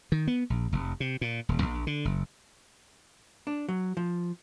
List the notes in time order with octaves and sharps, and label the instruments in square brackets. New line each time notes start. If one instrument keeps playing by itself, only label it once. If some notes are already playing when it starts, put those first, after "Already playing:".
[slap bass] D#3
B3
A#1
F1
C3
A#2
D#1
A#1
D3
F#1
[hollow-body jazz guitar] D4
F#3
F3